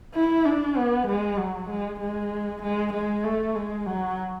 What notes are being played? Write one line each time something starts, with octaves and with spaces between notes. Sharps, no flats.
E4
D4
B3
G#3
F#3
G#3
G#3
G#3
G#3
A3
G#3
F#3